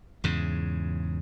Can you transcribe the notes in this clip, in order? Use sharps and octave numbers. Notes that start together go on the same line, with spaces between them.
E2 G#2 C#3